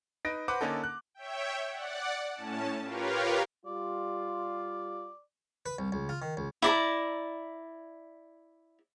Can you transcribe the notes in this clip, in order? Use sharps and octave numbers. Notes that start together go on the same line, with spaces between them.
D#4 B4 A#6 D7
B4 C5 F#5 D6
D3 A#3 C#4 D#4 A4
F#6
C#5 E5 G5
D5 F#5
A2 C#4 A5
F4 G4 A#4 B4 C#5 F5
G3 F4 D5
B4
C2
C#2
F4
D#3
C#2
E4 D5 A#5